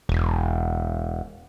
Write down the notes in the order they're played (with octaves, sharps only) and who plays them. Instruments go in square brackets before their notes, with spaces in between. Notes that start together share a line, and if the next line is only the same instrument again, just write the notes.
[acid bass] E1